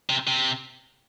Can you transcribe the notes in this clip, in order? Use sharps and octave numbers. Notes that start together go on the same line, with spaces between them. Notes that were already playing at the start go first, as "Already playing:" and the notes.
C3
C3